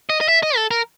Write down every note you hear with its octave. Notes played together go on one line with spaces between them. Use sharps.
D#5
D#5
E5
D#5
A4
A#4